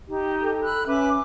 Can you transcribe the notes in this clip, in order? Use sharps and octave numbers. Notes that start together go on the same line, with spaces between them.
D#4 G4
A4
B5 E6 F#6
C#4 B4 E5 D6